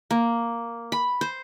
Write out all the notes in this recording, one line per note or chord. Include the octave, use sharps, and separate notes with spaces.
A#3
B5
C5